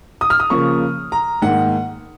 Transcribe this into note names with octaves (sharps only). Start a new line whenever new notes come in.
D#6
F6
D#6
C#3 F3 A#3 C#6
A#5
G#2 D#3 A#3 F#5